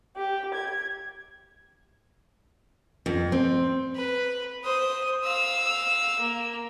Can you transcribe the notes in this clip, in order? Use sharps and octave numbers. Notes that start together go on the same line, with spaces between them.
G4
G#6
F2
C4
B4
C5 D#6
F5 E6
A#3